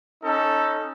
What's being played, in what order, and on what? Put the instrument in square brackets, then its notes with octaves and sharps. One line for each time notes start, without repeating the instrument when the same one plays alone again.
[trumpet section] C#4 D#4 A4